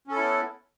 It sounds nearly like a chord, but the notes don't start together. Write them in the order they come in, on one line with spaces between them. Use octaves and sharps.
C#4 A4 E4 B3